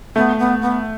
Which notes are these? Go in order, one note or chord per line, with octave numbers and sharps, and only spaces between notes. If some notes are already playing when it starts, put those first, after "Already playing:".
A3 B3
B3
B3